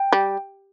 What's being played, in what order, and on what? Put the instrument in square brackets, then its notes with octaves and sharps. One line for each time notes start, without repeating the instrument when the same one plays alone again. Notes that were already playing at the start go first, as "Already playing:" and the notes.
Already playing: [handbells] G5
[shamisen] G3